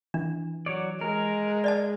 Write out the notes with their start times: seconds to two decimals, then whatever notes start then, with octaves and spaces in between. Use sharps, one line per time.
0.14 E3 D4
0.66 F#3 C#5 D5
1.01 G#3 A#4
1.64 D5 D#5 A5